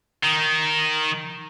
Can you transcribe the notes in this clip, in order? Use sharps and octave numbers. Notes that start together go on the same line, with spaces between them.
D#3